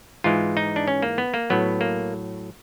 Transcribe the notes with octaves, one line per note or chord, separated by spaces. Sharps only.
G#2 E3 G#3 F4
D#4
D4
C#4
A#3
B3
A#3
A2 F#3 B3
A#3